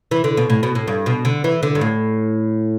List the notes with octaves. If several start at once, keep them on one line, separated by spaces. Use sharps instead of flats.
E3
D3
B2
A2
B2
A2
G2
B2
D3
E3
D3
G2
A2